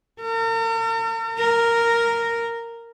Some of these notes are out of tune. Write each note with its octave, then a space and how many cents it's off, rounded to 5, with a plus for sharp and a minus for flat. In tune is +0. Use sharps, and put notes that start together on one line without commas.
A#4 -45
A#4 -5